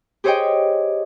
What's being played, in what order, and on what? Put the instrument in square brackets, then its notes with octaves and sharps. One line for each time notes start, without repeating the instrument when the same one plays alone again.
[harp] G4 G#4 C5 C#5 D#5 G5